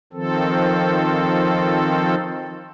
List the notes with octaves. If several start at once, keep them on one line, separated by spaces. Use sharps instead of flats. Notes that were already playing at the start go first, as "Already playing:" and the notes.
D#3 F3 C4 A4